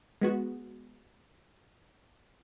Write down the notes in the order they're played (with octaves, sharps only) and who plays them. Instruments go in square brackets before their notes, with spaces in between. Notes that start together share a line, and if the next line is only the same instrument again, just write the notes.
[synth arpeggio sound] G#3 B3 F#4